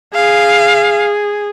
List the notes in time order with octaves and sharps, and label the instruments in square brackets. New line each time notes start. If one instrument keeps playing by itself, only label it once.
[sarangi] G#4 [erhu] F5